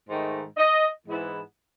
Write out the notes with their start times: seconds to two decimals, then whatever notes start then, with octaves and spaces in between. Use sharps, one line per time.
0.08 G#2 D#3 A3
0.57 D#5
1.07 G#2 E3 G#3 B3 E4